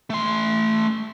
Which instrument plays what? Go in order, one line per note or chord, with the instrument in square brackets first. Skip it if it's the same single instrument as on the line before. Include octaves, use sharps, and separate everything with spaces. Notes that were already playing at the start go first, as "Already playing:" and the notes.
[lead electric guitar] A3 C6